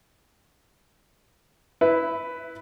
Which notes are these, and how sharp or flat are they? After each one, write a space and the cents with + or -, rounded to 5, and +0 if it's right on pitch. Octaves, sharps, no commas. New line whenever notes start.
E4 -10 B4 +10